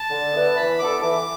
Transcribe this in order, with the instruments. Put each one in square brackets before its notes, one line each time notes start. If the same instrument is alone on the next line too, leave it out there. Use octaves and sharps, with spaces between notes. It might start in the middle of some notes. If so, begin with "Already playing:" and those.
Already playing: [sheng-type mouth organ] A5
[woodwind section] D3
B3 E4 B4 D5
[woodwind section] E3 [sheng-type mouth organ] B5
[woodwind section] B3 D4 A4 [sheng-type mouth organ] D6
[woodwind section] E3 [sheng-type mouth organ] D6